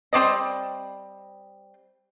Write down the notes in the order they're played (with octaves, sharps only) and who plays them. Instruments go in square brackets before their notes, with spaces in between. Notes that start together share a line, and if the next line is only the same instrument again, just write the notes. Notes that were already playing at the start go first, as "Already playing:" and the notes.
[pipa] G3 C4 D5 D#5